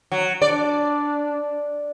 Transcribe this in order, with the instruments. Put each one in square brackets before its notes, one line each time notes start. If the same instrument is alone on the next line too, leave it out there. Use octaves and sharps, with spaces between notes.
[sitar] F#3
[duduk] D4 [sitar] D5